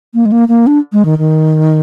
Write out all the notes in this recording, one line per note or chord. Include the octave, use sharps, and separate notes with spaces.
A#3
G#3
A#3
A#3
D4
G#3
D#3
D#3